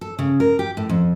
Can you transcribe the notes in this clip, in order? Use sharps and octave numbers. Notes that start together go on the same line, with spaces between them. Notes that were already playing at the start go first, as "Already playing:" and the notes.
A4
C#3
A#4
G4
A2
F2